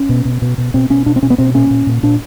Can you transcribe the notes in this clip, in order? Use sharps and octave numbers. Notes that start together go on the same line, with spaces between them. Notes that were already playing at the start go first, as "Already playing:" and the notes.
Already playing: C#4
B2
B2
B2
B2
B2 C4
B2 C#4
B2 D4
C4
B2 C#4
B3
B2 C4
A#2 C#4
A#2
A#2
A#2 D4